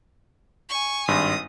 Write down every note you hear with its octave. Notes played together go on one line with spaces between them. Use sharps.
G#5 C#6
G#1 G2 C6 D#6